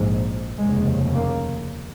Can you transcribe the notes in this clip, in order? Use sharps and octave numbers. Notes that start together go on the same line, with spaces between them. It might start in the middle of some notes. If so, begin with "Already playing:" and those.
Already playing: A#1 G#2
F1 D#2 C#3 G#3
A#3